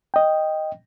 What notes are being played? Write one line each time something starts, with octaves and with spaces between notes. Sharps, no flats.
D#5 G5